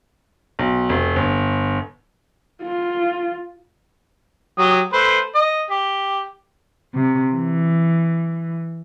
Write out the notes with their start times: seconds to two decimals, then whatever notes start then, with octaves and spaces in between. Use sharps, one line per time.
0.59 B1
0.89 F1
1.16 G1
2.62 F4
4.58 F#3 G4 D#6
4.93 A3 B4 C5
5.35 D#5
5.71 G4
6.94 C3
7.34 E3